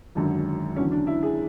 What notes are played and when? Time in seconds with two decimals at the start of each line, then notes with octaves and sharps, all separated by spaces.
0.15 G#1 F#2 D3 F#3
0.76 E2 D3 F#3 C#4
0.92 D4
1.07 E4
1.23 G#4